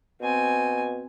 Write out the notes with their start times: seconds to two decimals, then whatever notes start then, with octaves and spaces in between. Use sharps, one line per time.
0.21 B2 C4 G#5